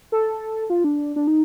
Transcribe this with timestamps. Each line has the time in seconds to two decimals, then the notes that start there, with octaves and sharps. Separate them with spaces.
0.12 A4
0.70 F4
0.84 D4
1.16 D4
1.27 D#4